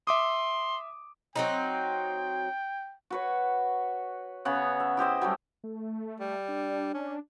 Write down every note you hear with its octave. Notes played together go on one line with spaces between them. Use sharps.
E5 C6 D6 D#6
F#3 C4 D#4 G5
F#4 B4 C#5
C#3 B3 C#5 F#5
E5
E4 G4 C5 D#5
F#3 G3 A3
A3
G3
D4
C#4